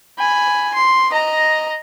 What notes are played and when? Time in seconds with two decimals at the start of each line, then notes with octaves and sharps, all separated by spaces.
0.19 G#5 B5
0.74 C6
1.11 D#5 A#5